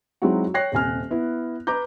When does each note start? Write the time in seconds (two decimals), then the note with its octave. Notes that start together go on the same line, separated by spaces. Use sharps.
0.22 F#3 G#3 C4 D#4 E4 F#4
0.54 C#5 G5 F#6 A#6 C7
0.72 D#1 C3 G#5 F6
1.11 B3 E4
1.67 B4 A#5 D6 G6